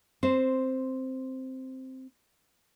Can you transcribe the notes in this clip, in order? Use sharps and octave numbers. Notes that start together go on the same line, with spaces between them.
C4 C5